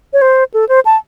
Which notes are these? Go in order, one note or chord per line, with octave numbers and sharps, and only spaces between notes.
C#5
C5
A4
C5
A5